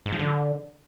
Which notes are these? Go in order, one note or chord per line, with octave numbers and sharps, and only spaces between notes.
G#2
F3
D3